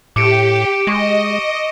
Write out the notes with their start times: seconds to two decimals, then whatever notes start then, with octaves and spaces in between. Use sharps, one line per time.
0.16 A2 G4 D6 C#7 D7
0.87 G#3 D#5 C#6 A#6